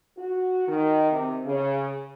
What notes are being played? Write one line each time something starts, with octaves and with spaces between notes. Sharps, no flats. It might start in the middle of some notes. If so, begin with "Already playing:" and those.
F#4
D#3
C3
C#3